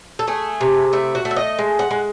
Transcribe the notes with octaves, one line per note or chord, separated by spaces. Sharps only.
A4
A3 G#4
C3
A3 E4
F#4
A3
E5
D#5
G#3
F#5
G#3